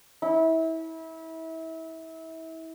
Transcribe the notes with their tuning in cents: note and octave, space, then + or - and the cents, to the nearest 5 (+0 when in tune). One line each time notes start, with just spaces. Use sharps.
E4 -30